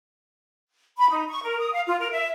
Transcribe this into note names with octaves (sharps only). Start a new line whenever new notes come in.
B5
D#4
C#6
A#4
D#6
F5
F4
A#4
E5